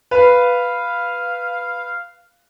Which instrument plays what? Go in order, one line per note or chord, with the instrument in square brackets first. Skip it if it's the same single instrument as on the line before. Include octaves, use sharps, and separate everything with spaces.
[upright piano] B4 [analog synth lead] F5